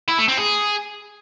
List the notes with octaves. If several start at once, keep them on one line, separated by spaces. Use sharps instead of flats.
E4
A3
C4
G#4